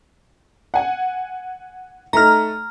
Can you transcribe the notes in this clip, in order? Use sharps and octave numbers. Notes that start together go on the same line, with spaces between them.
F#5 G#5
A3 D#4 A#5 F6